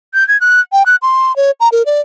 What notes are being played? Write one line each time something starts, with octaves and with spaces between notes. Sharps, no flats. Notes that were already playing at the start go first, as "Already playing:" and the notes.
G6
G#6
F#6
G5
F#6
C6
C#5
A#5
A#4
D5